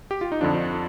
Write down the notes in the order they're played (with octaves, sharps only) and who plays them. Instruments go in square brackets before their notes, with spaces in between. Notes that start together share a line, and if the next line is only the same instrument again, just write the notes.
[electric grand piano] G4
F4
D#4
F2 D3 F3 D4